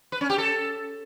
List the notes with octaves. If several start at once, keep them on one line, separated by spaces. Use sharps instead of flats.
B4
C#4
G4
A4